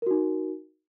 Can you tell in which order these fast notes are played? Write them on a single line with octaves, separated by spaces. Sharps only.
A#4 F#4 D#4